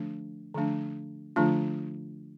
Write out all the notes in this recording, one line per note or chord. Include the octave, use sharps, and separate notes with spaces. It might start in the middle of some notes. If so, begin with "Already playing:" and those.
Already playing: D3 F3 A3 D4
D3 F3 A3 D4
D3 F3 A3 D4 F4